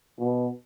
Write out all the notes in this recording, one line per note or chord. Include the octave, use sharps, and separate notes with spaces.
B2